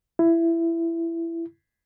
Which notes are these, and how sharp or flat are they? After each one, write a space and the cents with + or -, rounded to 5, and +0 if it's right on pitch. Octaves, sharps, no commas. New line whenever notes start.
E4 +15